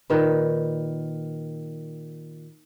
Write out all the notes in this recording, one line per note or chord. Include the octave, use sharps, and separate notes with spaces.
A#2 D#3 B4